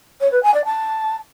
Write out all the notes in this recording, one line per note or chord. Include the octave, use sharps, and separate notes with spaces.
C#5
B4
G#5
D5
A5